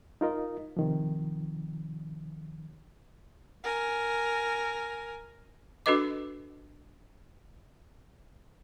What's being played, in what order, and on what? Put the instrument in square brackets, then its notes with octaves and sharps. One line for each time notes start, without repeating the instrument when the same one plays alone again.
[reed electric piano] D#4 F4 A#4 D#5
C3 D#3 F3
[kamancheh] A#4 G#5
[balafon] D4 F#4 A4 B4 D#5 D6